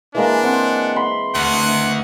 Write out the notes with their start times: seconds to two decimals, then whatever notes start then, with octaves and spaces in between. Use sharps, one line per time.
0.15 E3 G#3 A#3 D4
0.44 C4 F#5
0.96 B5 C6
1.35 D2 F#5